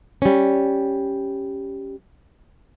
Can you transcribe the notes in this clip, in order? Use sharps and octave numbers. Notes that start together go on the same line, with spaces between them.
G3 C#4